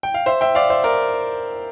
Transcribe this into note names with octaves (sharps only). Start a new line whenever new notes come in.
G5
F5
C5 E5
E5 G5
D5 F5
C5 E5
A#4 D5